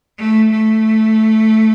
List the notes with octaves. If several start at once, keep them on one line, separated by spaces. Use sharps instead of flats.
A3
A3